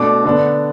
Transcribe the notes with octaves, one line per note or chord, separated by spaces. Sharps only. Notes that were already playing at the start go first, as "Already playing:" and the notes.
Already playing: B2 A3 D4 D6
D3 B3 D4